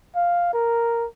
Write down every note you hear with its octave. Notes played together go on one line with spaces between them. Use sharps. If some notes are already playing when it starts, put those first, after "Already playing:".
F5
A#4